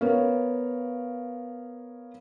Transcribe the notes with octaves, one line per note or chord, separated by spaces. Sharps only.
B3 A#4 C#5 F5